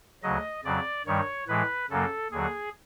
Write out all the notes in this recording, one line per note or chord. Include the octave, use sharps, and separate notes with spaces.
D2 C#3 F#3 D#5
F2 C#3 F#3 D5
G2 D#3 G3 C#5
A2 E3 G#3 B4
F#2 C#3 F#3 A#3 A4
D#2 D3 F#3 G#4